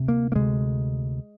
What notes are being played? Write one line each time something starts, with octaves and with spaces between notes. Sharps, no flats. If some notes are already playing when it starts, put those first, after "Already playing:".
Already playing: D2 C3
A#3
A#3
D2 C3 G#3